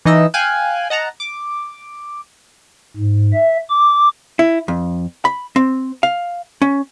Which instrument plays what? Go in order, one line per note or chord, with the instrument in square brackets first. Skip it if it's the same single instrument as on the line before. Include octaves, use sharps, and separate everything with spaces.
[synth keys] E3 D#4 D#5 E6
F5 G5 G#5 F#6
D#5 F#5 A5 A#5
D6
[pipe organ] G#2
E5
D6
[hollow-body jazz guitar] E4
F2
B5
C4
F5
C#4